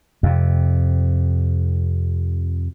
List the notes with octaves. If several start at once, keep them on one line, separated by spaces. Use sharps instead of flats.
F2 C3